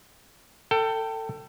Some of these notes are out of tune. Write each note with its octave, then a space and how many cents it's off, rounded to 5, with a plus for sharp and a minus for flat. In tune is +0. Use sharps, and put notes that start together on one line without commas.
A4 +25 G5 -10